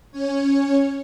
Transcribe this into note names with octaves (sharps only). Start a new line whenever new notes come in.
C#4 C#5